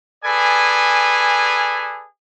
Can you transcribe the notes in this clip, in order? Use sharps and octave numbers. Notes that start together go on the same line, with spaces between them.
G#4 A4 B4 D5 G#5